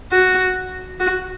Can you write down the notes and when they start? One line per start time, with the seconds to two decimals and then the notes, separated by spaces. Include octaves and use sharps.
0.12 F#4
1.00 F#4